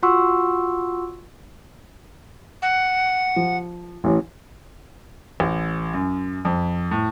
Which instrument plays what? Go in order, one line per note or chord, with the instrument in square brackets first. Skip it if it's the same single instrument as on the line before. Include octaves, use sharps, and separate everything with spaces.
[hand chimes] F4 F#4 F#5 C6 C#6 E6
[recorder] F#5
[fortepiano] F3
A1 E3 C#4
[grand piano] A1
F#2
F2
A2